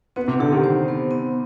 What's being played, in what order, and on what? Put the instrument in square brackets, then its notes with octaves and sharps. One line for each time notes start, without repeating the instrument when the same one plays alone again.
[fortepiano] B3 [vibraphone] C4
[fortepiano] C3
[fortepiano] D3 [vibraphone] G4
[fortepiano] D#3
[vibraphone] C5
B3
C4